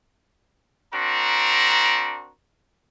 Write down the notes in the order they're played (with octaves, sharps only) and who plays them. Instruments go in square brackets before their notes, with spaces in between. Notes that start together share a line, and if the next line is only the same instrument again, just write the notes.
[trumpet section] C4 D4 F#4 A#4 A#5